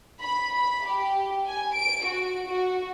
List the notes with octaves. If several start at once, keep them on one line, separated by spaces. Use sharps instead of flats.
B5
B5
G4
G#5
D7
F#4
F#4